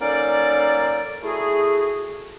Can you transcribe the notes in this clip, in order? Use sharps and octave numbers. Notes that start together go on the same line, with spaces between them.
F#3 A#3 C#4 D#4 A4 D5
A3 E4 F#4 G#4